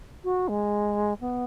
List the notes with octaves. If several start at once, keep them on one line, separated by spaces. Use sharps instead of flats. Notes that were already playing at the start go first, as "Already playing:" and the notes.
F#4
G#3
B3